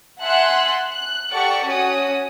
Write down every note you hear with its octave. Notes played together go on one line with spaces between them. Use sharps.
E5 F#5 G#5 A5 C6 F#6
F#6
G4 A4 D5 F#5 A5 C#6
C#4 F#4 D#6